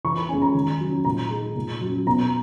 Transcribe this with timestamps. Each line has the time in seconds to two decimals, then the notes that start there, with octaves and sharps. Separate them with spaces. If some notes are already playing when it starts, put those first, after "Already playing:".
0.04 E3 C#6
0.16 B5
0.29 G#3 C#4 G#5
0.42 A#5
0.54 D#3
0.80 F#3 C#4
1.05 A#2 A#5
1.30 G#3 D#4
1.55 A#2
1.81 F#3 C#4
2.06 B2 A#5